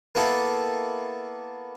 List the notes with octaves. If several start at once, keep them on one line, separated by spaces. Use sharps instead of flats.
A#3 B3 E4 A4